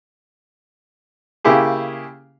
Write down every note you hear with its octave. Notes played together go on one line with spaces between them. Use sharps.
C#3 A#3 E4 G4 G#4